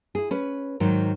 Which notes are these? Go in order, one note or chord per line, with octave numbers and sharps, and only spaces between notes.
E4 G#4
C#4 B4
G#2 D#3 F#3